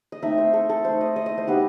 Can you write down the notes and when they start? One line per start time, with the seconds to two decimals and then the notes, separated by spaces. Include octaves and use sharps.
0.12 D#5
0.22 A3 C4 D#4 E5
0.38 C5
0.53 A4
0.69 A4
0.84 A3 D#4 C5
1.01 D#5
1.16 D#5
1.26 D#5
1.38 C5
1.47 F#3 B3 D#4 G4